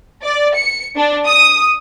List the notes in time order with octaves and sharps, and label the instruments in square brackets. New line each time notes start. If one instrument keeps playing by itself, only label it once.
[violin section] D5
C#7
D4
D#6